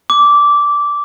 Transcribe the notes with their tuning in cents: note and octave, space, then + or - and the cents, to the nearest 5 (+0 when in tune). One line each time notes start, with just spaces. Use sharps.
D6 -10